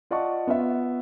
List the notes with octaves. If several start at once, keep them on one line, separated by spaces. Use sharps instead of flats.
F4 D5 D#5 F#5 A5 C#6
B3 F4 B4 E5